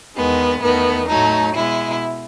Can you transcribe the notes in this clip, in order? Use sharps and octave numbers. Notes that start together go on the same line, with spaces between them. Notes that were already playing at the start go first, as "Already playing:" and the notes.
E2 D#3 G#3 B3
E2 D#3 A3 B3
A2 F#3 A3 D#4
B2 G#3 E4